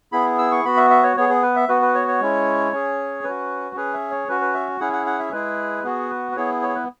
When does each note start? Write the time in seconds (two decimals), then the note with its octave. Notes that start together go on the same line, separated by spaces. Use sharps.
0.12 B3 E4 G#4 B5
0.38 E6
0.51 C#6
0.64 B3 F#4 B5
0.77 E5
0.90 E5
1.03 C#5
1.17 B3 G#4 C#5
1.29 G#4
1.42 B4
1.56 E5
1.68 B3 F#4 B4
1.82 B4
1.95 C#5
2.08 C#5
2.20 G#3 C#4 E4
2.72 C#4 G#4
3.24 C#4 F#4 B4
3.76 C#4 G#4 B4
3.94 E5
4.10 C#5
4.28 C#4 F#4 B4
4.41 B4
4.54 E5
4.80 C#4 E4 G#4 F#5
4.93 F#5
5.06 F#5
5.19 E5
5.32 G#3 E4 G#4 B4
5.84 B3 F#4 G#4
6.10 B4
6.32 B4
6.36 B3 E4 G#4 C#5
6.63 C#5
6.68 G#4
6.75 B4